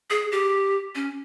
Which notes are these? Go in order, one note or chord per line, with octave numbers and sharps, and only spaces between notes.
G#4
G4
C#4